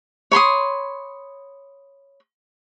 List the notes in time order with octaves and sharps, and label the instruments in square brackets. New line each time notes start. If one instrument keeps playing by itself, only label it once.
[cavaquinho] C#5 B5 C6 D#6